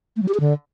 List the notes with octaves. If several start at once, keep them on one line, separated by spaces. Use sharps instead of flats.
A3
F#3
G4
G#4
D3